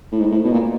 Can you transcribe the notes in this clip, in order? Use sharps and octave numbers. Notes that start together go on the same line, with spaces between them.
A2
G#2
A2
B2
A#2